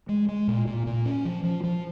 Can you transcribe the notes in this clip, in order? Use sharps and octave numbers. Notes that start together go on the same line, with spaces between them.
G#3
G#3
A#2
A#2
A#2
C#4
F3
F3
F3